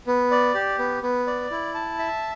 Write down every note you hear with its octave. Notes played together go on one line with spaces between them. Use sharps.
B3
D5
G4
B3
B3
D5
E4
A5
E5